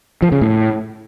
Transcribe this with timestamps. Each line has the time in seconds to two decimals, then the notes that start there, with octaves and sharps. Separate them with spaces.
0.22 F3
0.32 C#3
0.41 A2